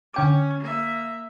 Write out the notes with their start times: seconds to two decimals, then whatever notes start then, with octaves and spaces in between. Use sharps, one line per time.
0.14 D3 C#4 G5 D6
0.60 A#3 E5